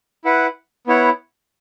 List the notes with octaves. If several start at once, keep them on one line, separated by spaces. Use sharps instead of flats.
E4 B4 F#5
B3 E4 C#5 F#5